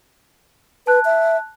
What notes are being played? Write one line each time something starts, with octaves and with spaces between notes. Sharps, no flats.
B4 A5 F#6
E5